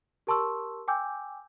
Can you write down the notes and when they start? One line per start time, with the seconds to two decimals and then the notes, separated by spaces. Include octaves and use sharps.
0.27 G4 A#4 A5 C6 C#6 E6
0.88 G5 G#5 D6 E6 G6